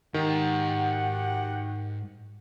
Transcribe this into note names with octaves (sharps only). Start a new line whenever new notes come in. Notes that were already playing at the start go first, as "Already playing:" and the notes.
G#2 D#3 F#4 G4 F#5 A#5